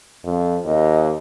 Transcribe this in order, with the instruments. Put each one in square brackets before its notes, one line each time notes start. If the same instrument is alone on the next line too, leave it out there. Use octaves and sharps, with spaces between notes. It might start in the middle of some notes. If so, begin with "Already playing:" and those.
[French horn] F2
[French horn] D#2 [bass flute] D#5